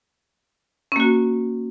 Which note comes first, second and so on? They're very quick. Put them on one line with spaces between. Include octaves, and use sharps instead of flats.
C#4 A#3 F#4